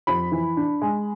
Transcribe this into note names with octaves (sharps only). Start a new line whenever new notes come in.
F2 B5
E3
D4
G#3